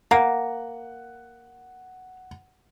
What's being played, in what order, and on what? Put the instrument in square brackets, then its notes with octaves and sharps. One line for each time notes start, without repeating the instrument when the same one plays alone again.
[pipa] A#3 [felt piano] F#5